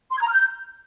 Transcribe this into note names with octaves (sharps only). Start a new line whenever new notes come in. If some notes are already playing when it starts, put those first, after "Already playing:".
C6
G#6
A#5
F6
G6